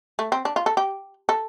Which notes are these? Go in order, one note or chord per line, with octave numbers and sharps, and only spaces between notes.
A3
C4
D4
F4
A4
G4
A4